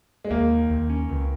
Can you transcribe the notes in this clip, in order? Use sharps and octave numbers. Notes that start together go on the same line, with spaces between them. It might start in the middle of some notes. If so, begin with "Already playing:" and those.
G#3
D#2 A#3
D#3
D#2
C#4
C#2